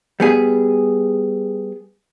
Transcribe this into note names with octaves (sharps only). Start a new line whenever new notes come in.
G3 B3 G#4